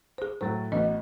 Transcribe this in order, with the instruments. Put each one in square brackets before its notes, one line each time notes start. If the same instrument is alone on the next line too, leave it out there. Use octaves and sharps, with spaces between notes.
[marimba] G#4 C5
[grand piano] A2 F#3 A6 [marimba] C5
[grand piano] A1 B3 F#4 [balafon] D#5